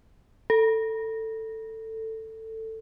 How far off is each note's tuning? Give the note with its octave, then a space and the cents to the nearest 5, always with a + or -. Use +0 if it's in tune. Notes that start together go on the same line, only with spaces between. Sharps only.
A4 +15